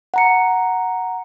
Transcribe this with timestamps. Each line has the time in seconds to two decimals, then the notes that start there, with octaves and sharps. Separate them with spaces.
0.14 F#5 A#5 C#7